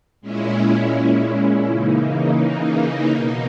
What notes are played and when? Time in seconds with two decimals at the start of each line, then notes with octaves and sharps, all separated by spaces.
0.21 A#2 G#3 C#4 E4
1.66 C#3 E3 A#3 D#4
3.11 B2 A#3 D#4